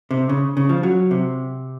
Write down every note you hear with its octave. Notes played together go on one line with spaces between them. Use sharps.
C3
C#3
C#3
F3
F#3
C3